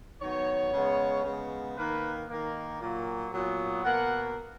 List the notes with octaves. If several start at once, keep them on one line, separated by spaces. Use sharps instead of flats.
D#3 F#3 B3 C#5
C#3 G#3 B3
C#3 G#3 B3
D#3 A#3 B4
D#3 A#3
A#2 F#3 A#3
A#2 F#3 B3
B2 A#3 F#5